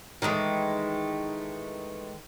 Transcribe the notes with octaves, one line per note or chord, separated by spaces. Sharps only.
D#3 E3 G#3 A3